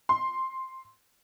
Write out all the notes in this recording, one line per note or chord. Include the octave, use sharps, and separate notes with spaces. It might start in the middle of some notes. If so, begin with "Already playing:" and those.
C6